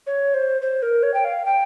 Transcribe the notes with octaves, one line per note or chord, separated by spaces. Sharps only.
C#5
C5
C5
A#4
C#5
G5
F5
G5